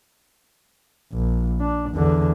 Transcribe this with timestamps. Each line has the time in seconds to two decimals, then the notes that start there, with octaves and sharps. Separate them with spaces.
1.13 A#1
1.60 D4
1.92 E2 D3